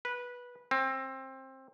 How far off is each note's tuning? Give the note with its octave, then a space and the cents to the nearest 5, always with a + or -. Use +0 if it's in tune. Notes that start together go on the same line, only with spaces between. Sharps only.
B4 -15
C4 +20